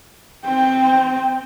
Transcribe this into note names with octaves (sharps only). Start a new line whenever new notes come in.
C4 G5